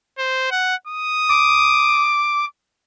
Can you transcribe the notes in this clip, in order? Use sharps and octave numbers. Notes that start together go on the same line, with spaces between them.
C5
F#5
D#6
D6